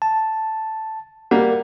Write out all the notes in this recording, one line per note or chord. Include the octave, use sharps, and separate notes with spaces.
A5
G3 A#3 F#5